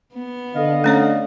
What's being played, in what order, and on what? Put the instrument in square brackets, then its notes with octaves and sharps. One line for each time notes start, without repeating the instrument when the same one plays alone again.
[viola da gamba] B3
[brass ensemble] D3 [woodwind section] D#5 F5
[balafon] A3 C#4 C#5